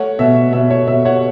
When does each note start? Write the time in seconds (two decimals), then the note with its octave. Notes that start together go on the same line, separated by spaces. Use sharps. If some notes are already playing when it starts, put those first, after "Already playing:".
Already playing: A3 C#5 F#5
0.19 B2 E5
0.53 B2 E5
0.70 C#5
0.88 B2 E5
1.05 C#5 F#5